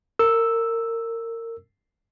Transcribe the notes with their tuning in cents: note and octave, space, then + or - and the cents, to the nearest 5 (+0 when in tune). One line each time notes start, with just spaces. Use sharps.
A#4 -25 E6 +0